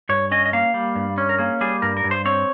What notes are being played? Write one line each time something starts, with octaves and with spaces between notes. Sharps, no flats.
G2 C#5
C#4 D#5
D#5
A#3 F5
G3
G2
C#4
A#4
A#3 G#4
G3 G#4
G2 A#4
A#4
G2
C5
C4 C#5